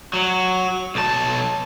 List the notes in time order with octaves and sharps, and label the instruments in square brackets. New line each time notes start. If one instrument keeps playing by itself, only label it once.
[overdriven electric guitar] F#3
B1 A5